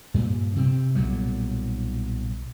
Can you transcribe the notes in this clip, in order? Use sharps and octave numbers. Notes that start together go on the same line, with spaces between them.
G2 A#2
C3 C4
B1 A#2 F#3 G3